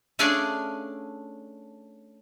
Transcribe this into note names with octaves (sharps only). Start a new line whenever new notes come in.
A3 C#4 D4 G#4 D5 F5